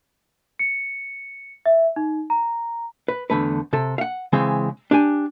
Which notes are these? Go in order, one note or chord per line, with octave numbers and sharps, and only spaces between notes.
C#7
E5
D#4
A#5
B4
E2 D3 A3 B4
C3 A4
F5 F#5
C#3 E3 G#3 C4
D4 G4 G#5